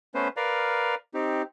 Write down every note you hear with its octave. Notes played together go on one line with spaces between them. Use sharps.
A3 B3 C#4 B4 C5
A#4 B4 D5 F5 A#5
C4 D#4 G4